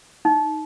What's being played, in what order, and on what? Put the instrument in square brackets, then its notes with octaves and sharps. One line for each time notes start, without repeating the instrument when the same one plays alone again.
[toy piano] D#4